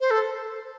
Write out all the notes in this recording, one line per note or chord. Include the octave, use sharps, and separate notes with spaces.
C5
A4